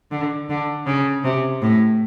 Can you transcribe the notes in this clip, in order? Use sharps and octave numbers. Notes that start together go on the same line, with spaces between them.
D3
D3
C#3
C3
A2